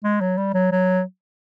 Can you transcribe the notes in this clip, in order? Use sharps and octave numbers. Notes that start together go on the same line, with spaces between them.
G#3
F#3
G3
F#3
F#3